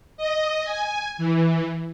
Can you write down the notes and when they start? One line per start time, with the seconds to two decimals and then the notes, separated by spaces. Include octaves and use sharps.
0.17 D#5
0.64 G#5
1.18 E3